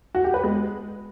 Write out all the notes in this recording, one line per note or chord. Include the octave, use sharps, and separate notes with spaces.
F#4
G4
B4
G#3